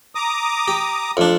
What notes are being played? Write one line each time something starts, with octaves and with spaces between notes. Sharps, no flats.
A#5 D6 D#6
G4
F2 D4